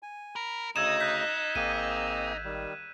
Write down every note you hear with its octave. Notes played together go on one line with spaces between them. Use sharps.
G#5
A#4 B5
D2 C#3 D#4 D#5 E6 G#6 E7
F#6 G6 B6
G#1 A#3 C4 G#4 D#7
D#3 G3